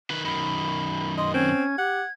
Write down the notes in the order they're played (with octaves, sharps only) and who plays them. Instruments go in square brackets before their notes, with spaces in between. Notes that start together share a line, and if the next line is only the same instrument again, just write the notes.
[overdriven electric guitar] D#3 B4
[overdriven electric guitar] F#2 D#3 [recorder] B5
[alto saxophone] D#5 [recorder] C6
[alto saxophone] C4 [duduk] C#4 [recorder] G#6
[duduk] G4 [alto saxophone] F#5